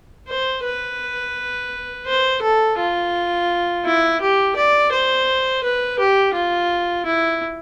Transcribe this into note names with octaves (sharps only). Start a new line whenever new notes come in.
C5
B4
C5
A4
F4
E4
G4
D5
C5
B4
G4
F4
E4